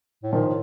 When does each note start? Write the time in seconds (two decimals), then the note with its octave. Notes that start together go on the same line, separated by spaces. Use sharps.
0.23 A2
0.32 A#2 D#3 F3
0.46 A2